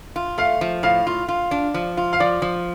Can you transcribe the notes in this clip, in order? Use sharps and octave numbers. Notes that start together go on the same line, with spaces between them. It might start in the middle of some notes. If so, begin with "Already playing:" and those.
F4
A3 F5
F3
A2 F5
F4
F4
D4
F3
F4
F5
F3 D5
F3